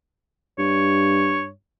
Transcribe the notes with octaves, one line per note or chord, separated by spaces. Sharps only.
G2 C#5